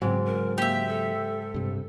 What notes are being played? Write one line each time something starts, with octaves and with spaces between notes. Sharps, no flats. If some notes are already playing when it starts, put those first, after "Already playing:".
G#2 C#3 F#3 C4
A#4
A#3 G4 E5
A4
G2 C3